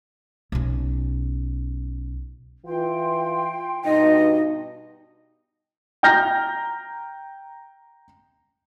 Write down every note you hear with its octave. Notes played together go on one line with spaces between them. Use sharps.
B1 C#4
E3 F4 G5 C6
G2 B2 D#4 D#5
G5 A#5 F6 G6 A#6